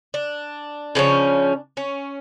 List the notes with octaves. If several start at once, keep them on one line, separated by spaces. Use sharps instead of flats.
D4
C#3 F3 C#4
C#4